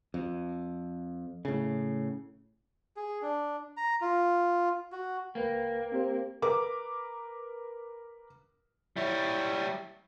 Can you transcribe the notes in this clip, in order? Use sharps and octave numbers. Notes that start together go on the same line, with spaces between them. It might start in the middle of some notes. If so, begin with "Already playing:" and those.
F2
A2 C#3
G#4
D4
A#5
F4
F#4
C#2 A#3 B4 G5
C4 G4 C5
A#4 B4 D6
G3 E4 C#5